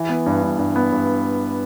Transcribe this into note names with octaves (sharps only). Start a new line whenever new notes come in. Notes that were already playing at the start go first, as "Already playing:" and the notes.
Already playing: E3
B3
G2
G2
G2
B3
G2